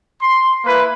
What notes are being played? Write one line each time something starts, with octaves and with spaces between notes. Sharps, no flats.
C6
A#3 E4 B4